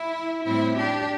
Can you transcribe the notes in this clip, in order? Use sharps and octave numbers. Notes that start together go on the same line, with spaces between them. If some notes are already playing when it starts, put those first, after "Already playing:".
Already playing: E4
A2 G3 C4 E4
D4 G4